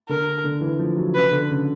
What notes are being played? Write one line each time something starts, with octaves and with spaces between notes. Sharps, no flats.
D3 A#4
D3
E3
F3
F#3
C#3 B4
D3
C#3